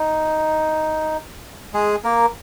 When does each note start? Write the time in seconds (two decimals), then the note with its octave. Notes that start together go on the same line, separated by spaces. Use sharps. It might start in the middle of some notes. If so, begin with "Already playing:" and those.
Already playing: D#4
1.73 G#3 G#4
2.04 A#3 A#4